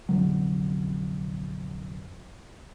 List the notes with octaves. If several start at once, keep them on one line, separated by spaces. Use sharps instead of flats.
F1 A#1 D3 F#3